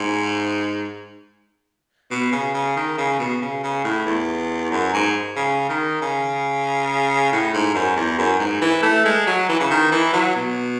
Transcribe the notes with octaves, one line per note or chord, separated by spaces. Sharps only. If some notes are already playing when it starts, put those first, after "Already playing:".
Already playing: G#2
B2
C#3
C#3
D#3
C#3
B2
C#3
C#3
A2
E2
F#2
G#2
C#3
D#3
C#3
A2
G#2
F#2
E2
F#2
G#2
E3
A3
G#3
F#3
E3
C#3
D#3
E3
F#3
B2